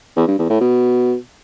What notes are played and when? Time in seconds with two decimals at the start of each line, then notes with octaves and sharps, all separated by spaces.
0.16 E2
0.28 G2
0.39 E2
0.50 A2
0.61 B2